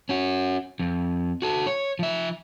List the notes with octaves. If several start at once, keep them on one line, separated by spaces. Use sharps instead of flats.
C#4 F#4
F2
F#4 A4
C#5
F3 E5